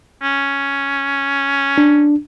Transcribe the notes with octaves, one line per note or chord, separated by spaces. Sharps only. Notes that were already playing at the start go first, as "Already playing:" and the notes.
C#4
D4